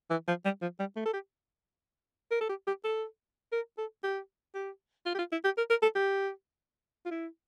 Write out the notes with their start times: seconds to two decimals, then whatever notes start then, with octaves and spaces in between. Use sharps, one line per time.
0.11 E3
0.28 F3
0.45 G3
0.62 F3
0.80 G3
0.96 A3
1.06 A4
1.13 G4
2.31 A#4
2.41 A4
2.49 G4
2.67 G4
2.84 A4
3.52 A#4
3.78 A4
4.04 G4
4.55 G4
5.06 F4
5.15 G4
5.19 F4
5.32 E4
5.44 G4
5.58 A#4
5.70 A#4
5.82 A4
5.95 G4
7.06 F4
7.11 E4